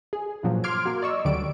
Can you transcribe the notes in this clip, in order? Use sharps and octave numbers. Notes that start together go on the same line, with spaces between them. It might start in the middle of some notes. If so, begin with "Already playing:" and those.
G#4
G2 A#2 F3 F#3
C6 D6 F6 G#6 D7
A#3 F#4
D5 D#5 C#6 E6
D2 D3 F#3 G3 D5 D7